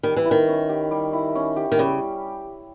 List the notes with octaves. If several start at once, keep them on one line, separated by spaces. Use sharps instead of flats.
D#3 G3
E3
E4
D#3
C#4
G4
G3
E4
C#4
G4
D#3
C#3 G3